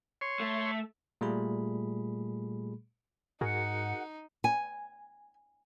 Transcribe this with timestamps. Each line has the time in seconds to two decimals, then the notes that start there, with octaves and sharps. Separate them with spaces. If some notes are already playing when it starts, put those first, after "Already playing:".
0.21 C#5 C6
0.40 A3
1.21 A#2 G3 A3 G#4 B5
3.41 G#2 D#4 F#4 G#4 A#4 F#5
4.44 G#5